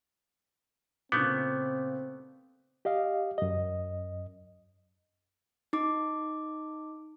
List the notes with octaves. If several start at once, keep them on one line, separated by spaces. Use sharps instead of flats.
A#2 C#3 A3 B3 C4 D6 G6
G4 D#5 F5
F#2 D#5
D#4 D6